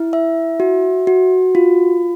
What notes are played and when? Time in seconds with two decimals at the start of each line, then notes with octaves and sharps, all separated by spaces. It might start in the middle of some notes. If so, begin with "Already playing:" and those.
Already playing: E4
0.13 E5
0.60 F#4
1.07 F#4
1.55 F4